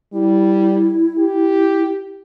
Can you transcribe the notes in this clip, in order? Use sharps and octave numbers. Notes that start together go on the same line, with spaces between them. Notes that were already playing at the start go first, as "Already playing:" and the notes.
G3 E4
G4